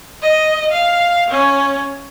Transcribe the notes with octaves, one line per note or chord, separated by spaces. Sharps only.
D#5
F5
C#4